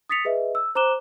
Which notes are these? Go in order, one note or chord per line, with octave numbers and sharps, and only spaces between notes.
D#6 A6 B6 C#7 F7
G#4 B4 D#5 E5
E6
C5 A#5 D6 F#6 E7 G7